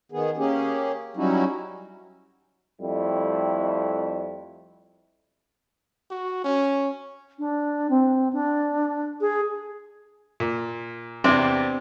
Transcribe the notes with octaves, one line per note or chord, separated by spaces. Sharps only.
D#3 B3 G#4
A#3 C#4 G4 G#4
F#3 G3 C#4 D#4 E4 F#4
F2 G3 A3 E4
F#4
C#4
D4
C4
D4
G#4
A#2
E2 C3 C4 D4